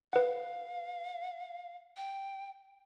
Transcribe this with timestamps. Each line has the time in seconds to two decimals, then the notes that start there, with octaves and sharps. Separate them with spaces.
0.13 B4 F5 F#5
1.97 G5